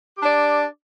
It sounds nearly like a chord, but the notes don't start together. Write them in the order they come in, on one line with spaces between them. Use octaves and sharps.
G4 D4 D5